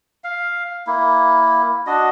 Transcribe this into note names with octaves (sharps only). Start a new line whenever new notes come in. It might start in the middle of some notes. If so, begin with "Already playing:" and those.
F5
A#3 E4
D4 F#4 D#5